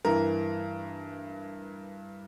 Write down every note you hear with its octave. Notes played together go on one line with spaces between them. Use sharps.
G2 E3 A#4